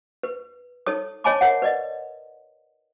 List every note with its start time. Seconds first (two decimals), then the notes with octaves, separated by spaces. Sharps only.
0.23 B4
0.87 D#4 A4 C#5 D#6
1.24 C#5 D#5 G#5 A5 B5 D6
1.41 A#4 C#5 E5 F#5
1.62 B4 D5 D#5